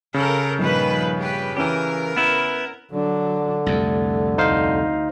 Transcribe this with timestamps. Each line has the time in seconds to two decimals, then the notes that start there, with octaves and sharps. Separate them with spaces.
0.14 C#3 A4 A#4
0.59 A#1 G2 D#3 F3 B4 B5
1.18 G4 B4
1.57 E3 C#4 G4 A#4
2.16 B3 E4
2.91 D3 F#3 D4
3.66 C2 F2 A3
4.38 D2 D#4 C5 F5